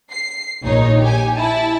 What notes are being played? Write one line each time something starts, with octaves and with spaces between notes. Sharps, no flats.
C7
A#1 D#2 D#4 C#5
G4 G#5
E4 A5